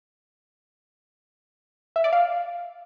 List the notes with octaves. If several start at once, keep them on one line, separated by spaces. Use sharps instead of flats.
E5
D5
F5